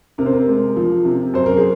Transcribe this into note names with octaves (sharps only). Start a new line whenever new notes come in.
C3 A#4
C5
A#4
G#3
F3
C3
F#2 C5
A#4
G#4